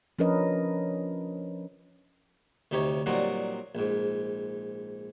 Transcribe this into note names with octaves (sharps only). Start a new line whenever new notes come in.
F3 C#4 D4 A#4 B4 D#5
D2 C3 D#4 G4 C#5
A#2 F#3 G3 C4 D#4 F#4
A#1 G#2